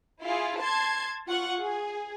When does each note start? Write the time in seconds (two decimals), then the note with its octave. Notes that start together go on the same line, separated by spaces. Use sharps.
0.22 E4 F4 G#4
0.60 A5 C6 G#6
1.27 F4 F#5 C#6
1.60 G#4